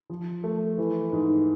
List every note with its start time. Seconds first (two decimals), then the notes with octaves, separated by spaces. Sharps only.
0.10 F3
0.44 A3
0.78 E3
1.12 G#2